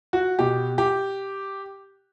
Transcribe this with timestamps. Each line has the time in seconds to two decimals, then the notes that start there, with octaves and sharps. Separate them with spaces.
0.13 F#4
0.39 B2 G4
0.78 G4